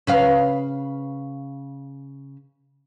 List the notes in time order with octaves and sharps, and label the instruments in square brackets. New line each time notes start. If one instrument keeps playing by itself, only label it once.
[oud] C#3 B4 F5